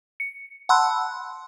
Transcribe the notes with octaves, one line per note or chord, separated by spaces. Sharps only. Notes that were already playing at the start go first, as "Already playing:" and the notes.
C#7
F#5 A5 B5 C6 E6 F#6